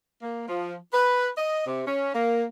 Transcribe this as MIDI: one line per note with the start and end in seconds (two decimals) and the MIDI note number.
0.22 0.45 58
0.48 0.75 53
0.93 1.28 71
1.37 1.63 75
1.66 1.83 48
1.87 2.11 61
2.13 2.44 58